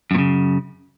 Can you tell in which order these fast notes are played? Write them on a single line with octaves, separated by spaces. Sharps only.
F#2 A#2 C#3